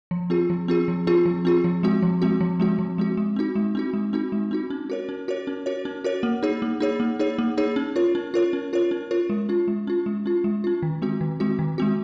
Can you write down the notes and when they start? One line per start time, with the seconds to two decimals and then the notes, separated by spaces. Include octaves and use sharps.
0.11 F3
0.30 C4 F4 G#4
0.50 F3
0.68 C4 F4 G#4
0.88 F3
1.07 C4 F4 G#4
1.25 F3
1.45 C4 F4 G#4
1.64 F3
1.83 G#3 C4 F#4
2.02 F3
2.22 G#3 C4 F#4
2.41 F3
2.60 G#3 C4 F#4
2.79 F3
2.98 G#3 C4 F#4
3.17 G#3
3.36 C4 D#4 F#4
3.55 G#3
3.75 C4 D#4 F#4
3.94 G#3
4.13 C4 D#4 F#4
4.32 G#3
4.51 C4 D#4 F#4
4.70 C#4
4.90 F#4 A#4 C#5
5.09 C#4
5.28 F#4 A#4 C#5
5.47 C#4
5.66 F#4 A#4 C#5
5.85 C#4
6.04 F#4 A#4 C#5
6.23 A#3
6.43 D#4 G#4 C#5
6.62 A#3
6.80 D#4 G#4 C#5
7.00 A#3
7.19 D#4 G#4 C#5
7.38 A#3
7.57 D#4 G#4 C#5
7.76 C#4
7.96 F4 A#4 C#5
8.15 C#4
8.34 F4 A#4 C#5
8.53 C#4
8.73 F4 A#4 C#5
8.91 C#4
9.11 F4 A#4 C#5
9.30 G#3
9.49 C#4 F4
9.68 G#3
9.87 C#4 F4
10.06 G#3
10.26 C#4 F4
10.44 G#3
10.64 C#4 F4
10.82 D#3
11.02 G#3 C4 F#4
11.21 D#3
11.40 G#3 C4 F#4
11.59 D#3
11.78 G#3 C4 F#4